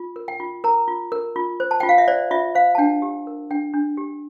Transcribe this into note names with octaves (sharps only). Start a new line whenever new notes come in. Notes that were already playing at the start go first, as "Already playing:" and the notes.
Already playing: F4
A#4
G5
F4
A#4 A#5
F4
A#4
F4
C5
A5
F4 G5
F5
E5
C5 D5
F4 E5
C5 F5
A5
D4 G5
G4
A#4
D4 G5
D4
G4